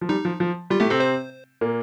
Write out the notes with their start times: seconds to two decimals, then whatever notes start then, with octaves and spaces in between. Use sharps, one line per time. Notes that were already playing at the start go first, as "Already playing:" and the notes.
0.01 F3
0.09 G3 D#4
0.25 F3
0.40 F3
0.70 G3 F4
0.80 A2 A3 G4
0.90 C3 C4 A4
1.00 C5
1.61 A#2 A#3